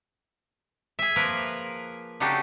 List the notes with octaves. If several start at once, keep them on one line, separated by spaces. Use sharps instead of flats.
G#4 E5
F3 A#3 A#4 B4
C#3 D4 D#4 F#4 G4 A4